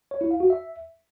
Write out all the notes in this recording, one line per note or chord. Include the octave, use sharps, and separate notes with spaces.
C#5
E4
F5
F#4
E5